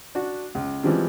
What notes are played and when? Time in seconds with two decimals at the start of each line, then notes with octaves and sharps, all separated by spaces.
0.15 D4 F#4
0.55 C#2
0.83 E3 F3 G3 G#3 C4